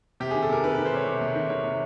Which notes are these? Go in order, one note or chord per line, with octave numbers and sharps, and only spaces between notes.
C3 G4
D#3 G#4
A4
C3 A#4
D#3 B4
D#3 B4
C5
C3 C#5
C3
C3
D#3
D#3 C#5
C3